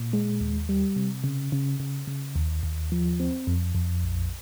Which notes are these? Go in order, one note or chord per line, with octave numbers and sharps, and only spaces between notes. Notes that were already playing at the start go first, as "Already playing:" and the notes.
Already playing: A#2
G#3
D#2
G3
C3
C#3
C#3
C#3
C#3
D#2
D#2
F3
C4
F2
F2
A#1